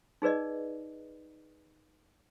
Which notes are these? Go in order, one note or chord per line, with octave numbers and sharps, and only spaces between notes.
D#4 G#4 B4 D5 D#5